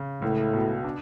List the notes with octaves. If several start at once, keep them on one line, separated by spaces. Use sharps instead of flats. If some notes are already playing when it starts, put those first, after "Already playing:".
Already playing: C#3
C#2 A2
B2
D4